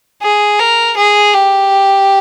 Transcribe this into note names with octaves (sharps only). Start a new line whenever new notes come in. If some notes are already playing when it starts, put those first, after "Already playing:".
G#4
A#4
G#4
G4